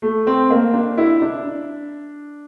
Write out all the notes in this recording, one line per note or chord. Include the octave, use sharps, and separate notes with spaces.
A3
C4
A#3
D4
E4
D4